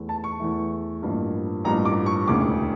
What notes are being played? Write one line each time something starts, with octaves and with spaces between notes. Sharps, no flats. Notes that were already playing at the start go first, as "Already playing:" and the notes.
Already playing: E2 E3 A3
A5
C#6
E2 E3 A3
A1 G2 F3 A#3
A1 G2 F3 A#3 A#5
D6
C#6
E1 D2 C#3 E3 D6